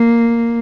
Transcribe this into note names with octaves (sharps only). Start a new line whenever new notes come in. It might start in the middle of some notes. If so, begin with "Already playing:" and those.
Already playing: A#3